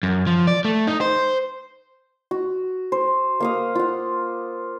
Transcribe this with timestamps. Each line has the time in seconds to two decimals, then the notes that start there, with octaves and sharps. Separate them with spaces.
0.03 F#2
0.27 F3
0.47 D5
0.65 A3
0.87 D#4
1.01 C5
2.31 F#4
2.92 C5
3.40 A#3 F5 D#6
3.75 F4 F#5